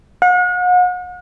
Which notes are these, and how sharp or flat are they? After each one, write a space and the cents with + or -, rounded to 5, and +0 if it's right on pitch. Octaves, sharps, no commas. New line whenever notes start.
F#5 -40